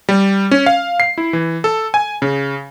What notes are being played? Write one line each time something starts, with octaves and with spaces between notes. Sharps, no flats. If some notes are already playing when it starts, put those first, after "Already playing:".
G3
C#4
F5
C7
E4
E3
A4
G#5
C#3